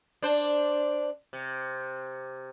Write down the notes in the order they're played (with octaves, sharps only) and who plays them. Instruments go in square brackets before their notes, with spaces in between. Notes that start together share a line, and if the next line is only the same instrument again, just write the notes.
[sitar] D4 C5
C3